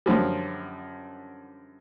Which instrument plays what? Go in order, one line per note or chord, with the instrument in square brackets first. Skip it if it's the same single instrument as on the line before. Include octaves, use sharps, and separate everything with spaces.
[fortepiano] F#2 D3 F3 G3